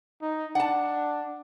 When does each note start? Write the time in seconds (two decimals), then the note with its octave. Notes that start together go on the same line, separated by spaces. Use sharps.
0.21 D#4
0.55 D4 F#5 A5